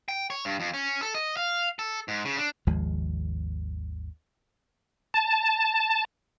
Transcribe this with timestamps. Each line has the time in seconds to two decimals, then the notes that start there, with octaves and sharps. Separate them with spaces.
0.08 G5
0.30 C#5
0.45 G2
0.60 F2
0.73 C#4
1.02 A4
1.15 D#5
1.37 F5
1.79 A4
2.08 G#2
2.25 C#3
2.38 D4
2.67 G#1 D#2 F3 G#3
5.14 A5